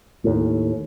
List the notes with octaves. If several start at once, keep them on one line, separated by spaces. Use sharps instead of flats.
D#2 A2